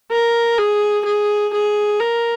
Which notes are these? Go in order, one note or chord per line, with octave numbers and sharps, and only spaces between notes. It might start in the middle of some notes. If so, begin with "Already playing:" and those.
A#4
G#4
G#4
G#4
A#4